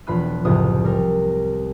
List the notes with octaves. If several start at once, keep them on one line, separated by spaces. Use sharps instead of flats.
E1 F3 F4 B5 F#6 D#7
F#1 C2 A2 F3 D#6 F6
G3 A#4